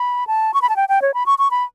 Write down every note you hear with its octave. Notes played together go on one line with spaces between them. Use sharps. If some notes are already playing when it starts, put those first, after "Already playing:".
Already playing: B5
A5
C#6
B5
A5
G5
G5
C#5
B5
C#6
C#6
B5